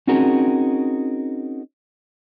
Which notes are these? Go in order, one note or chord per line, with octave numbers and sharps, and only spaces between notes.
C4 C#4 D#4 F#4 G#4 A#4